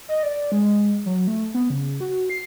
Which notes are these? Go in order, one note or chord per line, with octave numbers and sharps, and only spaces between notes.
D#5
D5
G#3
F#3
A3
B3
C#3
F#4
C7